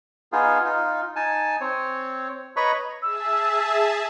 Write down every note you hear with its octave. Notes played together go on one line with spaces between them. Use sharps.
B3 D#4 F4 G#4
D#4 F4
D#4 G#5 A5
C4 C#5
B4 C#5 D#5 A#5 B5 C#6
G#4 E5 A5 E6